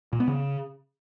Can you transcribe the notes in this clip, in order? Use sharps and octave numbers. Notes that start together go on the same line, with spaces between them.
A#2
B3
C#3